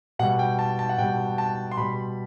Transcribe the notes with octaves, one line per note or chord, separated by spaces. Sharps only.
B2 G3 F#5
G5
A5
A5
F#5
B2 G3 G5
A5
C6
B2 G3 B5